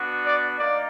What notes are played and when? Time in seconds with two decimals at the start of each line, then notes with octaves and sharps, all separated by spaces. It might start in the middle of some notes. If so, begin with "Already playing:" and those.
Already playing: B3 D4 F#4
0.25 D5
0.58 A#3 D#4 D5